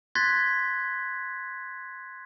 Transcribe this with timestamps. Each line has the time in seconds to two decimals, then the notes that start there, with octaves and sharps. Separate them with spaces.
0.15 C6 F#6 G#6 A6 B6